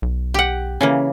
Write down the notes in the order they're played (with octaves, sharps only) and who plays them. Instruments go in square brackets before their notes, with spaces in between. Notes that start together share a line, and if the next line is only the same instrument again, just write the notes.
[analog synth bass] B1
[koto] G4 F#5
[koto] C#3 E3 A#3 [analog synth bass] C#4